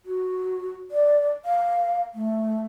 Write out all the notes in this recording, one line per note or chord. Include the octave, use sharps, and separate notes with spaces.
F#4
D5
F5
A3